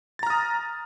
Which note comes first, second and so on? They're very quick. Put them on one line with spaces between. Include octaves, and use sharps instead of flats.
A6 A#5 F6 D#6